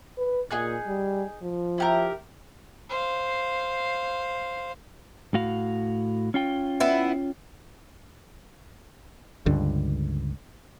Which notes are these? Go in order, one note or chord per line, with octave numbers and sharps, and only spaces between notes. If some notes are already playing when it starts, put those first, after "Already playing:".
B4
A#2 D#4 G#4 F#6
G3
F3
E4 G4 A#4
C5 F5
A2 F#4 F5
C#4 F4 G5
B3 E4
C#2 G2 D3